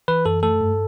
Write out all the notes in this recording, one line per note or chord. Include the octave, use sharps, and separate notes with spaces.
E3 B4
F#2 A4
A3 A4
G2